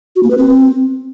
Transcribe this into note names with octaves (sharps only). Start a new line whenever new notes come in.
F#4
A#3
B4
C4